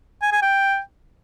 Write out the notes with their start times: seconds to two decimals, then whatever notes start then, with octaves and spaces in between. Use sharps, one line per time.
0.22 G#5
0.32 G#5
0.42 G5